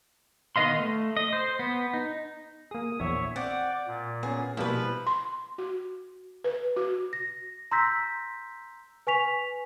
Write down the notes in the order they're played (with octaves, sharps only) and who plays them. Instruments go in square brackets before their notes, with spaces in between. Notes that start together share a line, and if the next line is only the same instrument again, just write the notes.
[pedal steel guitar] D#3 B3 D#5 F5 C6
A3
D#5
C5
B3
D#4
[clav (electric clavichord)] A#3 G#4 [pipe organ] D#6
[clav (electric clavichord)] A#1 E2 [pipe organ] C#5 E5
[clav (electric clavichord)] C4 [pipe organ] D5 G5 D6 [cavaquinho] F#5
[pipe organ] A#2
[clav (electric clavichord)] B3 C#4 [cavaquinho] G#4
[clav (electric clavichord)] B2 G3 A#3 [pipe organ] F3 [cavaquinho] E4 B4
[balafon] C6
F#4
B4
F#4
[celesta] A#6
A#5 C6 E6 G6 A#6 B6
B4 G#5 C#6 B6 F7